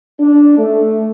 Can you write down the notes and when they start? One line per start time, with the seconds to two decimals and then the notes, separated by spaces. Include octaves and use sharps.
0.19 D4
0.58 A3